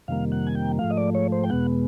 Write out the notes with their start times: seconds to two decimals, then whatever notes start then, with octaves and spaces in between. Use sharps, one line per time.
0.08 F2 C3 D#3 G3 A#3 F5
0.32 F#5
0.47 G#5
0.55 G5
0.79 G#2 F3 A3 F5
0.90 D#5
0.97 D5
1.15 C#5
1.32 C5
1.44 G5
1.50 E2 B2 G#3 B3 F#5